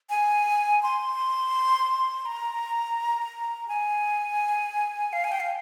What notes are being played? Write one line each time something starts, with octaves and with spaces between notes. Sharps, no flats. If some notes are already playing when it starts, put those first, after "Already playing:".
G#5
C6
A#5
G#5
F5
G#5
G5
F5